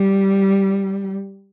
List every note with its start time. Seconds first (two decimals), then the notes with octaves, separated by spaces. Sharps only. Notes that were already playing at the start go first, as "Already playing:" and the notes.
Already playing: G3